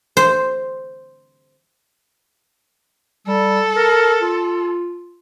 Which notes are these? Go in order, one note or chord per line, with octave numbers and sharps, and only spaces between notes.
C5
G3 A4
A#4
F4